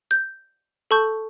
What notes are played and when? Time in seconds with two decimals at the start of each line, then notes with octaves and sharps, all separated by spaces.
0.11 G6
0.91 A4 A5 C#6 G6